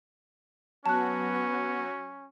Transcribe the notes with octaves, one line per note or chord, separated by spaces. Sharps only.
F#3 B3 C#4 F#4 A5 F#6